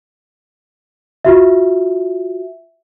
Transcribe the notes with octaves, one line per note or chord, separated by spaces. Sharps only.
F4 F#4 E5